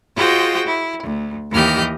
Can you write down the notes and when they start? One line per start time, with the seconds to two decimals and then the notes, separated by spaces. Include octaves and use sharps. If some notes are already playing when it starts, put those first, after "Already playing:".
0.15 F4 F#4 G#4 C5 D#5 G5
0.66 E4
1.02 D2
1.52 D#2 E3 G4 D#5 F6 G6